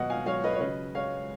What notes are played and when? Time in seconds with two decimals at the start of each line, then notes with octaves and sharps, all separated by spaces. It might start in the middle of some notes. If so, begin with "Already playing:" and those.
Already playing: B2 F#3 D#5 F#5
0.10 F5 G#5
0.26 F#3 C#5 F5
0.44 B4 D#5
0.53 C#5
0.60 C#3 B4 D#5
0.95 G#3 C#5 F5